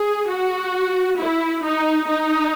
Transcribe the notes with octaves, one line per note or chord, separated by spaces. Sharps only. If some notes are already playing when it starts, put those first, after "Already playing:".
Already playing: G#4
F#4
E4
D#4
D#4